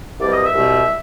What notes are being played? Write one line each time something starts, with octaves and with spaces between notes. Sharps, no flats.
C2 B2 G3 D5
D#5
E5
C2 B2 G3